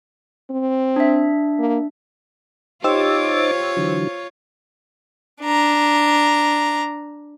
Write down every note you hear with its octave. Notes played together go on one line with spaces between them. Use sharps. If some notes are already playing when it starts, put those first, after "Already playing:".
C4
D4 E5
A#3
D#4 F4 G4 C5 C#5 D6 E6 A6
D3 E3 F#3
D4 A#5